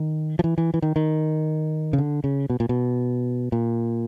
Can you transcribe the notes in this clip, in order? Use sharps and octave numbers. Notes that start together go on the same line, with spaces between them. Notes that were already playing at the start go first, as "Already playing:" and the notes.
Already playing: D#3
F3
E3
E3
E3
D#3
D#3
C#3
D3
C#3
B2
A#2
B2
A#2